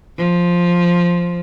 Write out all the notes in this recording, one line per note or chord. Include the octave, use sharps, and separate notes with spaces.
F3